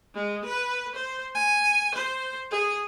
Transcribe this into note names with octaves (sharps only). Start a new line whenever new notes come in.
G#3
B4
C5
G#5
C5
G#4